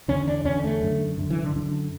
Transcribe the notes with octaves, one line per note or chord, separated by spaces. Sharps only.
E2 D3 C#4
D4
E2 D3 C#4
A3
F#2 D3
F#2 D3
E3
D3
F#2 D3